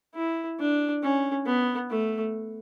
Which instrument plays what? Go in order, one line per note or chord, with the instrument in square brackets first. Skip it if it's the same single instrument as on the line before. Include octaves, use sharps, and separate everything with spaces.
[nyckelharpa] E4
D4
C#4
B3
A3